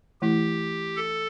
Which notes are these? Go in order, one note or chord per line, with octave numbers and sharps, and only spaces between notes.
E3 A3 E4 G4
A4